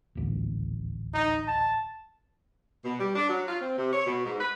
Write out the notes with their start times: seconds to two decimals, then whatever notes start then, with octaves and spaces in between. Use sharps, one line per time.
0.15 D#1 A1 D2
1.14 D#4
1.47 A5
2.85 B2
2.99 G3
3.16 D4
3.29 F#3
3.48 F4
3.61 C4
3.77 C3
3.93 C#5
4.06 B2
4.25 G#2
4.40 B4